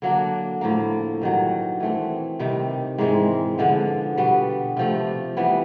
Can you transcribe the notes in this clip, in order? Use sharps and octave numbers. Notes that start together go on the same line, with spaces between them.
D3 F#3 A#3 D4
A2 F3 A#3
G2 D#3 F#3
E3 A3 C4
C3 D#3 G3
G#2 E3 G#3 C4
D3 F3 G#3 B3
B2 G3 B3
C3 F3 A3
E3 G3 B3